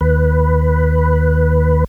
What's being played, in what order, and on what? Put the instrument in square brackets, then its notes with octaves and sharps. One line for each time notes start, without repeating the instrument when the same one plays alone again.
[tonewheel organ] D#2 B4